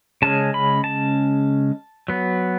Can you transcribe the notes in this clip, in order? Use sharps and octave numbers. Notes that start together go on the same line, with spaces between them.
C#3 G#3 C#4 A5
B5
A5
F#3 B3